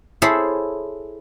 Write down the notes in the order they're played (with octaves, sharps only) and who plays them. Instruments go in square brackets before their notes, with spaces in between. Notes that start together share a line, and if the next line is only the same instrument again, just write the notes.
[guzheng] E4 G#4 A4 C5 C#5 E5